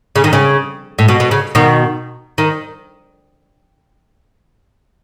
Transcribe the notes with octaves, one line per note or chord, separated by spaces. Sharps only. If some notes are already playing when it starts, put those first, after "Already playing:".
C#3
D#3
C#3
A2
B2
B2
C#3
B2 D#3
D#3